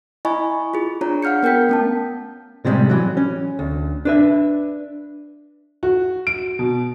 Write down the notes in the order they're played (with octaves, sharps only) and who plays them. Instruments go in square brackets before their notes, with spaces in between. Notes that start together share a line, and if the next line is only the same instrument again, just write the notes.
[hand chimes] E4 D#5 G#5 B5 C#6
F4 G#4
D4 F4 C#5 A#5
F5 F#5 F6 G6 C#7
B3 A#4 G5 G6 B6
A3 C#4 A5
[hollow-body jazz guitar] A2 C3 F3 G3 G#3
E3 F#3
C#4
D2
D4 B4 E5
[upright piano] F#4
D7
B2